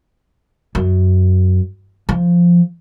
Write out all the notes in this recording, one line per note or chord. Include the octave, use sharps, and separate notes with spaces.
F#2
F3